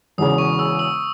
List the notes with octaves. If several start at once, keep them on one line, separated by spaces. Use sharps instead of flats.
E1 E2 C#3 D#6
C#6
E6
E6